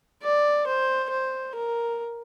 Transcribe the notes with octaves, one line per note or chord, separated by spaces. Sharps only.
D5
C5
C5
A#4